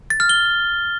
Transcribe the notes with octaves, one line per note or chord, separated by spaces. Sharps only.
A6
F6
G7